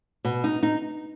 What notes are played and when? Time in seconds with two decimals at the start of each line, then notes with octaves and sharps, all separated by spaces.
0.25 B2
0.44 D#4
0.63 D#4